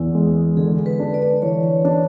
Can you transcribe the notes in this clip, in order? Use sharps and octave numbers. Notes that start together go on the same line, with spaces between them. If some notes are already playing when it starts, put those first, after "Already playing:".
Already playing: E2 E4
G#3
D3 G#4
B4
D4
D5
E3 C#5
D4